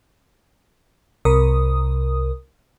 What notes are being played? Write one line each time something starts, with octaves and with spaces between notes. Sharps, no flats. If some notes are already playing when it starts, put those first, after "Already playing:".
C2 C3 A#4 D#6